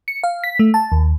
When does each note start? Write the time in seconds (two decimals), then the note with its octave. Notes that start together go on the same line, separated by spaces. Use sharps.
0.08 C#7
0.23 F5
0.44 B6
0.59 A3
0.74 A5
0.92 D#2